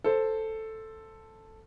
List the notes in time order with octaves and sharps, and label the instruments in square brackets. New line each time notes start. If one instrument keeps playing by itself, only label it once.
[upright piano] A4 C5